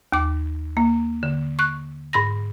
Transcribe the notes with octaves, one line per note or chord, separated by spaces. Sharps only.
D#2 D6
A#3
D3
C#6 F#6
G#2 B5 A#6